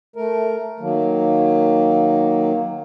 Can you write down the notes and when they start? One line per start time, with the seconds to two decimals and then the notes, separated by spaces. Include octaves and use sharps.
0.16 A3 A#4
0.80 D#3 F#3 A#3